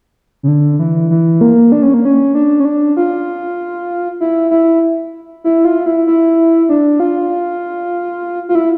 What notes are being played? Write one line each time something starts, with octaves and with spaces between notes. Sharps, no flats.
C#3
D3
E3
E3
A#3
D4
C#4
A#3
C#4
D4
C#4
D4
F4
E4
E4
E4
F4
E4
E4
D4
F4
F4
E4